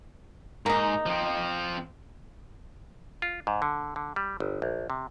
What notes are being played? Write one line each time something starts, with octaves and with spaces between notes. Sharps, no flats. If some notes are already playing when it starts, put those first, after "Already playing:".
G#2 A#3 D#4
F3 C4
F4
G#2
D3
D3
G3
G1
A#1
C3